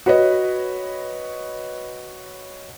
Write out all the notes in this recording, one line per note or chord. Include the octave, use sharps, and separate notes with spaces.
F#4 B4 C#5 D#5